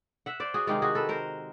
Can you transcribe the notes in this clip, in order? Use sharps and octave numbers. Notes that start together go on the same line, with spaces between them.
E5 F#5
C5 D5
F#4 G#4
C3 D#3 G#3 F4 G4
F#4 G#4
A4 B4
A#4 C5